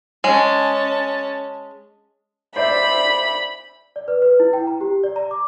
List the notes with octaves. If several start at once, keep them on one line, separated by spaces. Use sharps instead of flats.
G#3 C#4 A5
C5 D5 E5 B5
D5
B4
B4
E4
G5
A#5
G4
D5
A#5
D6